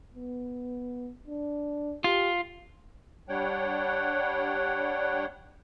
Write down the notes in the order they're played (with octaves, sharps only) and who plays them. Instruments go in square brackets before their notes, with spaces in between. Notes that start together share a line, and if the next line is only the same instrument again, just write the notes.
[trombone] B3
D4
[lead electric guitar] F4 [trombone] G4
[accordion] G3 D4 C#5 F#5 G5